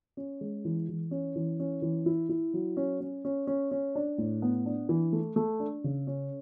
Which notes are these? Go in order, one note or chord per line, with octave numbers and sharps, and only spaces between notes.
C#4
G#3
E3
E3
C#4
E3
C#4
E3
E4
E4
F#3
C#4
C#4
C#4
C#4
C#4
D4
A2
B3
D4
E3
A3
A3
D4
C#3
C#4